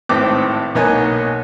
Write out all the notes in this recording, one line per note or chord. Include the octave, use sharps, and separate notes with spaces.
G#1 A2 C4 B4 D6
B1 A#3 B3 D#4 C#5 G#5